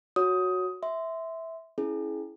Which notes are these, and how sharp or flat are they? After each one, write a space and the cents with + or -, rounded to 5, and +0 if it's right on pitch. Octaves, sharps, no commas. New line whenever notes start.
F#4 -5 C#5 +0 D#6 +15
E5 -10 C6 -15
C#4 +0 E4 +0 G#4 +25